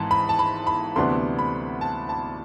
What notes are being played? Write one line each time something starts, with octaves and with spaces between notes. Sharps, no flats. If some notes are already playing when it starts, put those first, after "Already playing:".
Already playing: G#1 G#2 E3 A5
B5
A5
B5
B5
D2 C3 E3 B3 D4 C6
B5
A5
A5